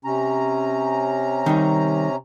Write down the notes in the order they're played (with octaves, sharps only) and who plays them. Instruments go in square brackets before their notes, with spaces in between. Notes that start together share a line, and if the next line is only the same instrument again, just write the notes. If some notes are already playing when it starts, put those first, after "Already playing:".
[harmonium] C3 C#4 A#5
[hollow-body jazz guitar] D#3 G3 D#4